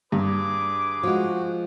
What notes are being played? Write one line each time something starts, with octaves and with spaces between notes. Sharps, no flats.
G2 G#4 B4 D6
F3 G#3 F#4